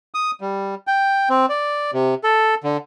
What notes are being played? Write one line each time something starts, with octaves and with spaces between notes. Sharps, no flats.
D#6
G3
G5
C4
D5
C3
A4
D3